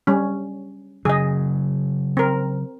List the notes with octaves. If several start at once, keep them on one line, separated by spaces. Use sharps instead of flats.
G3 C#4
C#3 F#3 G#4 D#5
C4 A#4